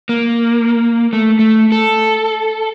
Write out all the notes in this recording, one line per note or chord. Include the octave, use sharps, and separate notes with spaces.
A#3
A3
A3
A4